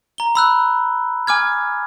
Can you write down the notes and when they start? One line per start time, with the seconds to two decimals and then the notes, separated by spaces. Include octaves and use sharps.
0.18 A#5 G7
0.35 B5 E6 F#6
1.27 G#5 D6 F6 G#6